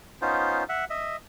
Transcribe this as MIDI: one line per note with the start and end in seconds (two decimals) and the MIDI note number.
0.22 0.64 59
0.22 0.64 61
0.22 0.64 63
0.22 0.64 65
0.22 0.64 72
0.69 0.85 76
0.69 0.85 78
0.90 1.16 75
0.90 1.16 76